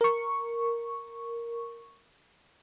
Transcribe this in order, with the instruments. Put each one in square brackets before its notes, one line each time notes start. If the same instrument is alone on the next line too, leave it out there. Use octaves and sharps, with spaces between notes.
[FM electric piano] A#4 C#6